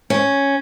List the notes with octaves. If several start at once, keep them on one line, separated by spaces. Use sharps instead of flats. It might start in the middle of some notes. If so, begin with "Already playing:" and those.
C#4